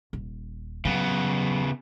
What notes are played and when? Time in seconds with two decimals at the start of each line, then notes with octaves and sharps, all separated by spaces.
0.13 D#1
0.85 C#3 F#3 B3